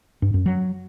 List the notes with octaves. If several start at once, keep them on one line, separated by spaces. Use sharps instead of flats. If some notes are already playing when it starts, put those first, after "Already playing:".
G2
F#2
F#3